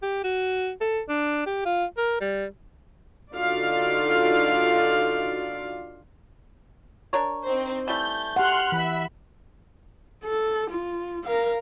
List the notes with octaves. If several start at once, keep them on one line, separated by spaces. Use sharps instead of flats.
G4
F#4
A4
D4
G4
F4
A#4
G3
D3 D#4 F4 F#4 D5 F5
D4 A#4 C#5
C4 D#4 C5
E3 G3 A3 G6
G4 F#5 C6 F6 F#6
E3 E5 B5
A4
F4
A#4 F5